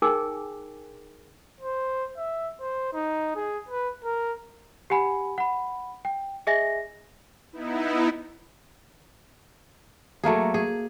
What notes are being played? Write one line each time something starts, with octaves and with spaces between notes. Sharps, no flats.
D#4 G#4 A#4 G5 G#5 D6
C5
E5
C5
D#4
G#4
B4
A#4
G4 F#5 G#5 B5
F#5 B5
G5
G#4 D#5 E5 G#5 A#6
B3 D#4 E4
F#3 A3 A#3 G#4
G#4